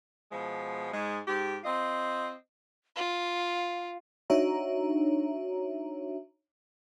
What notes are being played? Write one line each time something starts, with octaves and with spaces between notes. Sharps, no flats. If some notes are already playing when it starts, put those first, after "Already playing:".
B2 F3 G#3
G#2 G#3
G#2 G4
C4 F4 D#5
F4 F5
D4 D#4 F#4 C#5 E5 A#5